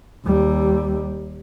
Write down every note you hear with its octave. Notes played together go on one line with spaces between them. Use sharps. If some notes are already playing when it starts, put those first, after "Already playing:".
D#2 G3